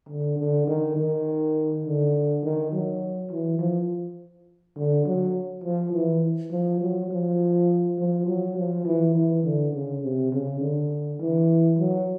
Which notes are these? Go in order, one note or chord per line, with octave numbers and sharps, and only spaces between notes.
D3
D3
D#3
D#3
D3
D#3
F#3
E3
F3
D3
F#3
F3
E3
F3
F#3
F3
F3
F#3
F3
E3
E3
D3
C#3
C3
C#3
D3
E3
F#3